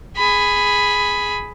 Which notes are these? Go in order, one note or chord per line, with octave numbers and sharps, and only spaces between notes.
G#4 B5